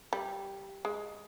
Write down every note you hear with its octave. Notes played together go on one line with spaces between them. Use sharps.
G3
G#3